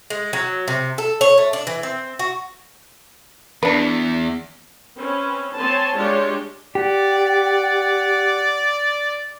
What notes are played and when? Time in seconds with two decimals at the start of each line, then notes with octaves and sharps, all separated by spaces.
0.10 G#3
0.33 F#3
0.68 C3
0.98 A4
1.21 C#5
1.38 A3
1.53 D4
1.67 E3
1.83 C4
2.19 F#4
3.63 E2 D4 B4
4.97 C4 C#4 B4
5.55 C4 C#5 G#5 A5 C6
5.96 G#3 D4 F4 G4 C#5
6.75 G4 D5 F#5